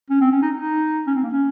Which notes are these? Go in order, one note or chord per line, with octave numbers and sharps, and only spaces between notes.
C#4
C4
C#4
D#4
D#4
C#4
C4
A#3
C#4